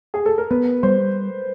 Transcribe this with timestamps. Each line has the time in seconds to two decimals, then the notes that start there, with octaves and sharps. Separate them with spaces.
0.14 G#4
0.26 A4
0.38 A#4
0.51 B3 B4
0.83 G3 C5